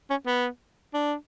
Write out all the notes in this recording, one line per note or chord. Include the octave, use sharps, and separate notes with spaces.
C#4
B3
D4